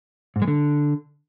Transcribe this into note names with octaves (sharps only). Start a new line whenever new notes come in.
G#2
G#3
D3